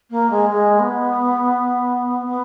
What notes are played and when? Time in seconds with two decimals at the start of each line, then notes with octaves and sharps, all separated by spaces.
0.10 A#3
0.30 G#3
0.50 G#3
0.79 B3
2.25 B3